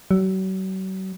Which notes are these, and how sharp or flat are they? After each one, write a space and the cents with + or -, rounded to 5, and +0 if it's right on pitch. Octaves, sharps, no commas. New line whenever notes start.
F#3 +40